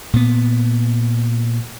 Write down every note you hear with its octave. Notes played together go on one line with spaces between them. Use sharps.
A#2 B3